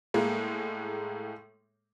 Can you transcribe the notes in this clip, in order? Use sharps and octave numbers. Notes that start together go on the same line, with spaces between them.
A2 G#3 A#3